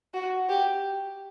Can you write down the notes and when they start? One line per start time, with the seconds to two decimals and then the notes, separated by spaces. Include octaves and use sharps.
0.14 F#4
0.49 G4